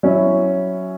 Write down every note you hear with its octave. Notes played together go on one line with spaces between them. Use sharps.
F#3 C#4 E4